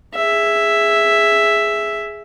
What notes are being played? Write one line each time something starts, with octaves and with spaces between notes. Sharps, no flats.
G#4 E5